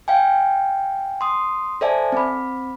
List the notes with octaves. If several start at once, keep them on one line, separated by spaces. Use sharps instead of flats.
F5 G5 G#5
C6 D#6
A4 C5 D5 E5 G#5 A5
C4 B5